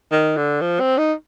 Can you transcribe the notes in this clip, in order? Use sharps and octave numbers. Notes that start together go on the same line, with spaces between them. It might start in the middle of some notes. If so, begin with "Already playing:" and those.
D#3
D3
F3
C4
D#4